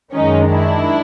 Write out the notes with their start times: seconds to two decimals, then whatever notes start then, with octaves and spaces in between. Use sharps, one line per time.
0.15 F#2 D#3 G#3 C#4 D#4
0.51 D4 E4